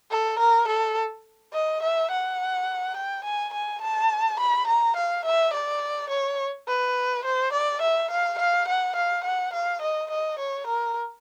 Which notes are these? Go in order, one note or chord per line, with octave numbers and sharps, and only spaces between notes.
A4
A#4
A4
D#5
E5
F#5
G5
G#5
G#5
A5
B5
A#5
F5
E5
D5
C#5
B4
C5
D5
E5
F5
F5
F#5
F5
F#5
F5
D#5
D#5
C#5
A#4